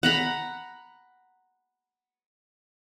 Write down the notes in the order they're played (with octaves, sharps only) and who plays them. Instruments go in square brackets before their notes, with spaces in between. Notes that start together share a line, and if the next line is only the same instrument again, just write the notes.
[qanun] F#5 A#5 B5